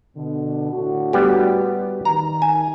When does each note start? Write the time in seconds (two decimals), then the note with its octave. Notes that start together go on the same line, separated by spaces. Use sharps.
0.17 B2 D3
0.72 A2 D3 F#4
1.13 G3 B3 G4
2.05 D#3 A#5
2.42 G#5